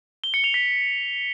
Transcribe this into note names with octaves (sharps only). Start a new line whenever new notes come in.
G7
C#7
F7
B6